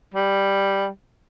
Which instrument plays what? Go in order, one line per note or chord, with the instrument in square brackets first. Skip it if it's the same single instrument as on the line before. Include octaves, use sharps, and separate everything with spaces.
[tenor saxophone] G3